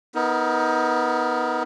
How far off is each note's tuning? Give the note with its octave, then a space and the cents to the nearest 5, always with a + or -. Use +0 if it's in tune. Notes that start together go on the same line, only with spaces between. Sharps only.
B3 +0 D#4 +30 A#4 +0